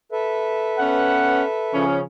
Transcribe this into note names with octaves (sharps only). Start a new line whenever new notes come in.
A4 B4 E5
B3 C#4 F#5
C#3 F3 C#4